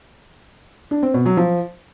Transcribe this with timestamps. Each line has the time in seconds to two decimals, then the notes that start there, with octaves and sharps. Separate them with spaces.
0.91 D4
1.03 C4
1.14 B2
1.26 F#3
1.37 F3